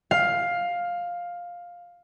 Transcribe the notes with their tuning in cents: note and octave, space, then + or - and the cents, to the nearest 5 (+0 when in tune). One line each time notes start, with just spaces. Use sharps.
F5 +10